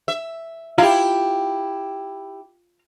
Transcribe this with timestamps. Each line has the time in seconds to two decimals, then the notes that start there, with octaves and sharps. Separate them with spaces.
0.08 E5
0.78 E4 F4 G4 F5 A#5